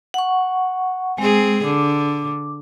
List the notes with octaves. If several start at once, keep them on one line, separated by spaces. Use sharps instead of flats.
F#5 C#6
G#3 C4 G#4
D3 D6